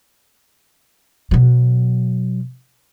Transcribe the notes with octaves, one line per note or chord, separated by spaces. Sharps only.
B2 F#3